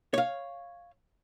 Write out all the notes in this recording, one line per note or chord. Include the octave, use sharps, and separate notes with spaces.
C#5 F5